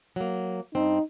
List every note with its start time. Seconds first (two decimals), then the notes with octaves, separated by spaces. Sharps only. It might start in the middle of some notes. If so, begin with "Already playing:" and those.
0.16 F#3 A#3
0.75 G2 C4 D#4